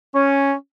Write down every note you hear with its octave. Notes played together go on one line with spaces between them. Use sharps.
C#4